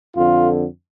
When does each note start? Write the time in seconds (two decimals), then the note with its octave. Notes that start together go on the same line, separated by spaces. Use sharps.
0.15 F2 D3 F4